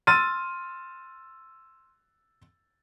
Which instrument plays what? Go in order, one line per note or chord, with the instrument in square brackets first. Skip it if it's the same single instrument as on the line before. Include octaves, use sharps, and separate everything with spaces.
[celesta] C6 F6 [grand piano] E6 A6 D#7